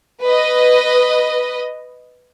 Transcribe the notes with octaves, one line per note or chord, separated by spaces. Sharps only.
B4 D#5